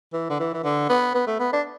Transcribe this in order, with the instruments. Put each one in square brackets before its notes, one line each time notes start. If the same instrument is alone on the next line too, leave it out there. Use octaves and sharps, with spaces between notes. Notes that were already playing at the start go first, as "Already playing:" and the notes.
[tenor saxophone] E3
D3
E3
E3
D3
B3
B3
A3
B3
D4